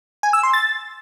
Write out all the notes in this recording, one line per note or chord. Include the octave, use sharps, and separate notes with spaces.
G#5
E6
C6
A6